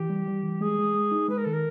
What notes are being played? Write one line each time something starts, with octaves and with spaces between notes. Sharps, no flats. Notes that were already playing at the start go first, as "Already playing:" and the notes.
Already playing: E3 G4
G3
G3
E3
G#3 G#4
G#3
G#3
D#4
G#3 B4
A#4
D#3 A4
A#4